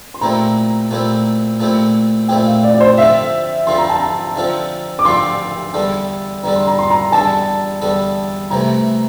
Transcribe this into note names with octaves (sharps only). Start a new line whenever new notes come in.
C6
A#2 A3 C4 E4 G4 A#5
A#2 A3 C4 E4 G4
A#2 A3 C4 E4 G4
A#2 A3 C4 E4 G4 G5
F5
D5
D5
C5
D3 F3 C4 F4 A4 E5
D3 F3 C4 F4 A4 C6
A#5
A5
A#5
D3 F3 C4 F4 A4
D6
D3 F3 C4 F4 A4 C6
E2 D3 G3 D4 A4
E2 D3 G3 D4 A4 A#5
C6
A#5
C6
A#5
E2 D3 G3 D4 A4 A5
E2 D3 G3 D4 A4
C2 C3 E3 A3 A#5